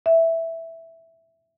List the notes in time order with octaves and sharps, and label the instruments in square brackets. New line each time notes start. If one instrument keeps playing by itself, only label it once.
[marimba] E5